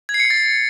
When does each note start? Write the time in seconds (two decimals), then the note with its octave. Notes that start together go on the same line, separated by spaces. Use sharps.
0.09 G#6
0.14 C7
0.20 C#7
0.25 G#6
0.30 A6